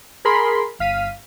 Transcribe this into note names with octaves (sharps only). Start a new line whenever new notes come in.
G#4 A#4 B5 C6
G1 F5 B6 D#7